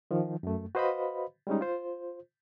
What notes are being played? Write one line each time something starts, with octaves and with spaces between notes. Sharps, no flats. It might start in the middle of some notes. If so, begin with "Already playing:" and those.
D#3 F3
F#2 A3
F#4 B4 C5 D#5 F5 B5
G3 G#3 C#4 D#4
F4 C5